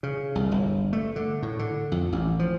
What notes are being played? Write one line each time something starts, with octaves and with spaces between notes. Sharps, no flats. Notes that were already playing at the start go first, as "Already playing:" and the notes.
C#3
C2
G1
A3
D3
A2
D3
F2
A1
F3